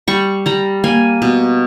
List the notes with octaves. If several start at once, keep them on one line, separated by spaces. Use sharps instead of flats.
G3 C#6
G3 A#5
A#3 G#5
B2